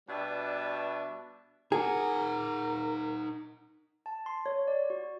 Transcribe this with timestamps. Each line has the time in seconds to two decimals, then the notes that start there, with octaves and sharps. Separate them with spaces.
0.09 B2 G3 D4 B4 E5
1.72 D#4 G#4 A#4 F#5
4.06 A5
4.26 C6
4.46 C#5
4.67 D5
4.90 F#4